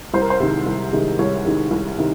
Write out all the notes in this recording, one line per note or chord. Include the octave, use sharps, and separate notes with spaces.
C2 C5
A#4
C5
C3 D#3 G#3
C2
C3 D#3 G#3
C2 C#5
C3 D#3 G#3
C2
C3 D#3